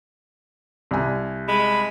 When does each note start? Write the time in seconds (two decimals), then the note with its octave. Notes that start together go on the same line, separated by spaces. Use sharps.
0.91 C2 G#5
1.48 G#3 B5